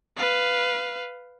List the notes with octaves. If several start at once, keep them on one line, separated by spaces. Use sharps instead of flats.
B4 F5